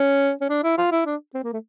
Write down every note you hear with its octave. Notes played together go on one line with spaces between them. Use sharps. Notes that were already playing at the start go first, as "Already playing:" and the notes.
Already playing: C#4
C#4
D4
E4
F4
E4
D4
C4
A#3
A3